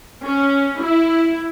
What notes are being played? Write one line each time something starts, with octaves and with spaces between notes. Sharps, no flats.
C#4
E4